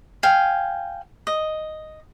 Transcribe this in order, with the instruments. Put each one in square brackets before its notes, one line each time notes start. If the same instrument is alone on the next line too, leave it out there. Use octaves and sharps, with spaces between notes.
[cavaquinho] F5 G5 G#5
D#5